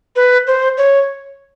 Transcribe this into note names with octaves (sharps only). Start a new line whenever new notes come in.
B4
C5
C#5